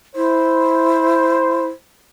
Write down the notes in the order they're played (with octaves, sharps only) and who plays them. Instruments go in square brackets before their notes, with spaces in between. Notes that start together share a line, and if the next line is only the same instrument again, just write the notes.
[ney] E4 [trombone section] C5